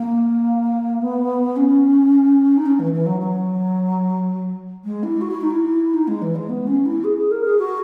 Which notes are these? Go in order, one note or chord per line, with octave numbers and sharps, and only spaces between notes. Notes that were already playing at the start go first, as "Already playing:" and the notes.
Already playing: A#3
B3
C#4
D#4
C#4
E3
E3
F#3
F#3
G#3
E4
F#4
E4
D#4
E4
D#4
G#3
E3
G#3
B3
C#4
E4
G#4
G#4
A#4
G#4
F#4